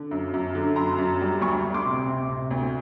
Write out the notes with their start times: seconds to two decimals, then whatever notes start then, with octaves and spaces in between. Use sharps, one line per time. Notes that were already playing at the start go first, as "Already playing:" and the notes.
Already playing: D3
0.11 F#2
0.34 F#2
0.55 D3
0.76 F#2 A#5 C6
0.98 F#2
1.21 G3
1.41 D2 B5 C#6
1.64 D2
1.74 C6 D6
1.85 C3
2.08 C3
2.29 C3
2.51 D2